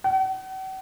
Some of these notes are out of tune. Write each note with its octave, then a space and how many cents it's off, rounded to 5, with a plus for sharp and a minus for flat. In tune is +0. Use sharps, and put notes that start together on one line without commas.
F#5 +45